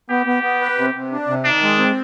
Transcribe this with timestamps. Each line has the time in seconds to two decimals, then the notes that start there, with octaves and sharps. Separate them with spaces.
0.10 B3 G4
0.26 B3
0.43 B3
0.61 B4
0.78 C3
0.94 C3
1.12 D4
1.28 C3
1.45 D#3 D4
1.63 G#3
1.78 C4